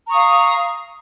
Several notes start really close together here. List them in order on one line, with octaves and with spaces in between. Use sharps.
A#5 C#6 D#6 F5